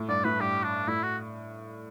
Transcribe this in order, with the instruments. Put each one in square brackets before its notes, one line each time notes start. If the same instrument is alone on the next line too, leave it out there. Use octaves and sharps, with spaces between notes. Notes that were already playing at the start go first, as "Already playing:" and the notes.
Already playing: [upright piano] A2
[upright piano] G2 [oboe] D5
[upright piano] A2 [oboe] B4
[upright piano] G2 [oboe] G4
[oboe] D4
[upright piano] A2 [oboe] E4
[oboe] F#4